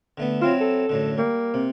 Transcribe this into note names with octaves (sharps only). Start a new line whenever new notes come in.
D3 A3 B3
F#3 C4 E4 F4
A4
F#2 A2 D3
G3 A#3
C3